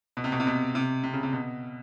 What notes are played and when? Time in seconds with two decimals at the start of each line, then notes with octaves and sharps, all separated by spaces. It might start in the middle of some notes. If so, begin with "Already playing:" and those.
0.17 B2
0.24 C3
0.32 B2
0.40 C3
0.47 B2
0.75 C3
1.03 C3
1.13 C#3
1.23 C3
1.33 B2